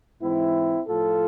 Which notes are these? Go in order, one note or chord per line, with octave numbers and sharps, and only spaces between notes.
G#2 E3 C4 E4
A2 F3 F4 A4